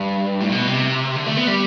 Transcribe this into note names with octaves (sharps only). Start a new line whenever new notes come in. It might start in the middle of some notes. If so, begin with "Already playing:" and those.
Already playing: G2
A2
B2
C3
D3
A3
B3
G3